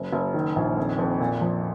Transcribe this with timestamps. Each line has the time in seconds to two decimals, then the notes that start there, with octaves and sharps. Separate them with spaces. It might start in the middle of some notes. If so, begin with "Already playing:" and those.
Already playing: F#1
0.12 F#1
0.34 D#3
0.56 A#1
0.77 F2
0.98 F2
1.20 A#2
1.41 F3